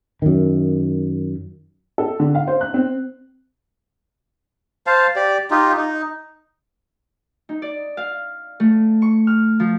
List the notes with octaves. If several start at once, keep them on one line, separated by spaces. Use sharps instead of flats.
F#2 D#3
A4
D3
F5
C5
F#6
C4
C5 F5 A5
G4 D5
D#4 F4 G4
D#4
D#4
D5
F5
A3
C#6
F6
F3